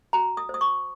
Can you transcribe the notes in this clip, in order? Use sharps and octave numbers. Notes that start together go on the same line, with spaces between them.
F#4 A#5
D#6
C5 D#6
C#6